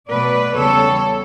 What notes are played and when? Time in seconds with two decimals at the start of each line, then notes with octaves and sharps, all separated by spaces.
0.08 B2 F#3 A3 B4 D5
0.54 E2 C#3 G3 B3 A4 C#5